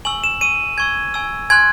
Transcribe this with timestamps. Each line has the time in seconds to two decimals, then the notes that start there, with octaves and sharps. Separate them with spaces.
0.05 G#5 C#6 E6 F#7
0.24 E7
0.41 G#5 C#6 E6 D#7
0.77 G#5 C#6 E6 G#6
1.14 G#5 C#6 E6
1.50 G#5 C6 F#6 G#6